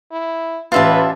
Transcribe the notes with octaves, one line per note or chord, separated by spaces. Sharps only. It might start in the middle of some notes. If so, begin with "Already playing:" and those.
E4
A1 F4 B4 E5 A5 A6